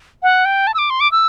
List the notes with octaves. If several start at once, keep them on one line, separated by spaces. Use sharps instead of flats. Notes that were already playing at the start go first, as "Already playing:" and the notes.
F#5
G5
A5
E6
D6
C6
D6
E6